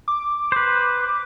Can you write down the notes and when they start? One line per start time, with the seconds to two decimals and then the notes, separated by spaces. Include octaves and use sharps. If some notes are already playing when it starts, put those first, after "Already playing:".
0.08 D6
0.52 B4 C5